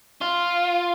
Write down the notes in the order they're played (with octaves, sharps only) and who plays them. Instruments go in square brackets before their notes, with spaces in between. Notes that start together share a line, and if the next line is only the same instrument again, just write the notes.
[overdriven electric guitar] F4